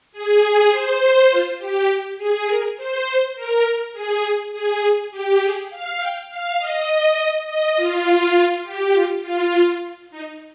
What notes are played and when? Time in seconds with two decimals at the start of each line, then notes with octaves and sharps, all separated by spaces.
0.12 G#4
0.71 C5
1.30 F4
1.59 G4
2.17 G#4
2.47 A#4
2.77 C5
3.05 C5
3.35 A#4
3.93 G#4
4.52 G#4
5.11 G4
5.40 G#4
5.70 F5
5.99 G5
6.29 F5
6.58 D#5
7.17 D#5
7.46 D#5
7.76 F4
8.34 F4
8.64 G4
8.93 F4
9.22 F4
9.52 F4
10.11 D#4